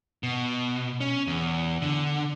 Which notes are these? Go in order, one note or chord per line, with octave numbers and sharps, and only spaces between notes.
B2
C#4
E2
D3